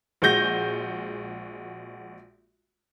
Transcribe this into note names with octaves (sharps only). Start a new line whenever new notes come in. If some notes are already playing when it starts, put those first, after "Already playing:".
A#1 G#3 F#4 G6 A#6